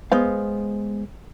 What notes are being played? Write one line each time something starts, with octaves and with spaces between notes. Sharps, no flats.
G#3 B3 C5 F5